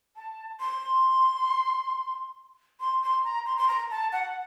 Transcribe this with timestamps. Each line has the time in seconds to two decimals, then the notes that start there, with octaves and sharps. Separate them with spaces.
0.16 A5
0.60 C6
2.80 C6
3.03 C6
3.24 A#5
3.46 C6
3.58 C6
3.68 A#5
3.91 A5
4.12 F#5